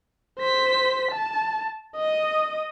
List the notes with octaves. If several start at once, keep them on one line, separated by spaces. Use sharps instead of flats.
C5 B6
A5
D#5 D#6